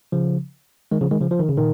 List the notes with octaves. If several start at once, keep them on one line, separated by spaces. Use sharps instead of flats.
C#3 F3
D#3 G#3
C#3 F3
D#3 G#3
C#3 F3
F3
D#3
C#3
A#2 D#3